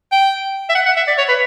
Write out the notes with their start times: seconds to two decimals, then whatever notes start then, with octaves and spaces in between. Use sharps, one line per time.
0.12 G5
0.70 E5
0.75 F#5
0.86 F#5
0.96 E5
1.07 D5
1.18 C#5
1.29 B4